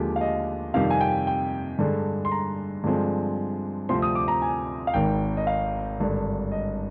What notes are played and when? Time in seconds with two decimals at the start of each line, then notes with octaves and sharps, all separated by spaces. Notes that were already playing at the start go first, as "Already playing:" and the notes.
Already playing: D#2 D3 F3 G#3 G4
0.16 F5
0.21 D#5
0.74 F2 C3 D#3 G3 F5
0.90 G#5
1.01 G5
1.27 G5
1.79 G2 D3 G#3
2.25 C6
2.32 A#5
2.84 G2 D3 F3 G#3 C4
3.89 D2 C3 F3 C4 C6
4.02 D#6
4.15 D6
4.28 A#5
4.42 G#5
4.87 F5
4.94 G#1 G#2 D#3 G5
5.37 D#5
5.47 F5
5.99 G#1 G2 D3
6.52 D#5